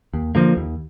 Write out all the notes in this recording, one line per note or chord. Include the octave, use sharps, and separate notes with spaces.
D#2
D3 F3 A#3
D#2